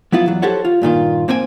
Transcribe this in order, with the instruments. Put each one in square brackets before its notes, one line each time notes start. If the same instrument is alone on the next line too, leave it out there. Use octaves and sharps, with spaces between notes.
[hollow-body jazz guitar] F#3 B3 E4 F4
E2 F#3
F#4 G4 A4 C5 C#5 F#5
F4
G2 A#2 D#3 F4
A#3 C4 C5 G5 G#5